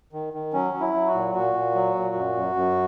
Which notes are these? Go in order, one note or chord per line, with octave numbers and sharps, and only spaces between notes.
D#3
D#3
F#3 C#4
F#3
E4
F#3
F#4
A#2
A#2 F#4
A#2
F#3
A#2
F#2
F#2
F#2